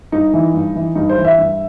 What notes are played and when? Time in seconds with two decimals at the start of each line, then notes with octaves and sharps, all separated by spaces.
0.12 G2 D#4
0.34 E3
0.54 G2
0.75 E3
0.95 G2 D#4
1.09 C5
1.17 E3
1.25 E5
1.39 G2